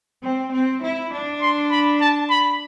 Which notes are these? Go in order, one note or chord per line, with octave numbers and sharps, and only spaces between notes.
C4
C4
E4
D4
C6
B5
A5
B5